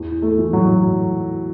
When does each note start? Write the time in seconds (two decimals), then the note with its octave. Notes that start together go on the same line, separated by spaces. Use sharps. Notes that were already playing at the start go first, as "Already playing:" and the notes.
Already playing: E2
0.22 A3
0.38 E3
0.53 F#3